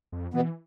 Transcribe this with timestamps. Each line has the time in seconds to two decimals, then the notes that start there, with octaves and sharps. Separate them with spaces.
0.12 F2
0.34 B2 E3 B3